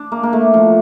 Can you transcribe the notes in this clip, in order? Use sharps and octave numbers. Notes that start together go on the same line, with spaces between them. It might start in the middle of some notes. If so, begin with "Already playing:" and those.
Already playing: D4
A#3
A#3
A3
F3